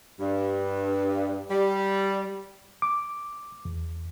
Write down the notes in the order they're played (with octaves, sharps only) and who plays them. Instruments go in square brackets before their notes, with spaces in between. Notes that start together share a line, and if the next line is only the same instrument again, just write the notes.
[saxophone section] G2
G3
[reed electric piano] D6
E2